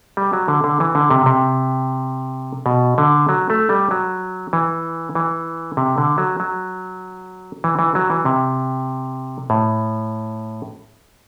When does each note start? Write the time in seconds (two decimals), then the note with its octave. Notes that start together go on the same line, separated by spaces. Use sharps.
0.17 G3
0.33 F#3
0.48 D3
0.64 D3
0.80 E3
0.95 D3
1.11 C3
1.26 C3
2.66 B2
2.98 D3
3.29 F#3
3.50 A3
3.69 G3
3.91 F#3
4.53 E3
5.15 E3
5.77 C3
5.98 D3
6.18 F#3
6.40 F#3
7.64 E3
7.79 E3
7.95 F#3
8.10 E3
8.25 C3
9.50 A2